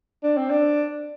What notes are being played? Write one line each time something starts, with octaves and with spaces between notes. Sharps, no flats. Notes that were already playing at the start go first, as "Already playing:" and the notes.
D4
C4
D4